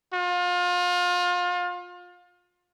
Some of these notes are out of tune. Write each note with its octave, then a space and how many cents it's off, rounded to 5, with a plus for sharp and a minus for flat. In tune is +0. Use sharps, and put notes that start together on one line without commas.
F4 +30